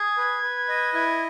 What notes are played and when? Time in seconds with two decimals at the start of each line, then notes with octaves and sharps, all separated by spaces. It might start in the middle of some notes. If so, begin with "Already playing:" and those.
Already playing: G#4 G#6
0.17 B4
0.43 B4
0.68 D#5
0.94 E4 G#6